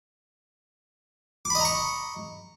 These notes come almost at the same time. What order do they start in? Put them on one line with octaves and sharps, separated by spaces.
D6 B5 D#5 A#5 C#6